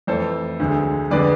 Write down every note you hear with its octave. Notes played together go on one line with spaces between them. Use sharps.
F2 E3 A3 A4 C5
D2 D3 G#3
F2 D3 G#3 B4 D5